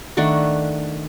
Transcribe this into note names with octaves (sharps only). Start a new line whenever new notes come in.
D#3 A3 D4 F#5